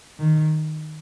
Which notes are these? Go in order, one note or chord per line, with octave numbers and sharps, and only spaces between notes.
D#3